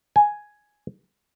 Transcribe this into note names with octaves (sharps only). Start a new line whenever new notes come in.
G#5